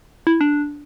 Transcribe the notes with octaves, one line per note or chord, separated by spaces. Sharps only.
E4
D4